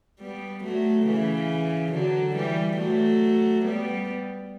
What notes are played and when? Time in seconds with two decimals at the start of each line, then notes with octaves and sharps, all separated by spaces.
0.20 G3 B3
0.63 F#3 A3
1.06 C#3 E3
1.92 D3 F#3
2.34 E3 G3
2.78 F#3 A3
3.65 G3 B3